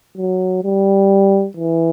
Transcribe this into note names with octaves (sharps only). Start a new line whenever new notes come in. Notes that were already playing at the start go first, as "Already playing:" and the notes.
F#3
G3
E3